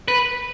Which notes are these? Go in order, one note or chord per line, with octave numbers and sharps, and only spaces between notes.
B4